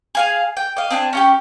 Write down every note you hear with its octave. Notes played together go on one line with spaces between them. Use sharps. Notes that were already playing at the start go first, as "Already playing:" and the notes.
G#4 F5 G#5
G5
D#5 F5
C4 D4 G#5
C#4 F4 G4